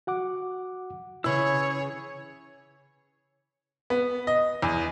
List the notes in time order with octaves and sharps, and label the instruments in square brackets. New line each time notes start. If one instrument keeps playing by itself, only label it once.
[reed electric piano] F#4 F#5 D6
[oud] C#3 E3 C#4 [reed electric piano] E4 [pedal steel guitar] G#4 B5 E6 [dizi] C#5
[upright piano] B3
D#5
E2